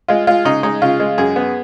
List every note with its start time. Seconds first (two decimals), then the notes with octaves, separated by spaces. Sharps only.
0.08 G#3 F4
0.27 G#3 F4
0.45 C#3 D#4
0.63 G#3 D#4
0.82 C#3 F4
1.00 G#3
1.18 F#2 G#4
1.36 B3